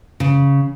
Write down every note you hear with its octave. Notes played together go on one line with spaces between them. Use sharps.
C#3